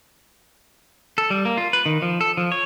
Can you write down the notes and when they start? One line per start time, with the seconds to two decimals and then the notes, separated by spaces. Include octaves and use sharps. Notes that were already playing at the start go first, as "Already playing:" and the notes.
1.18 A4
1.30 G3
1.45 A#3
1.57 F4
1.73 B4
1.86 D#3
2.02 F3
2.21 A4
2.37 F3
2.52 C#5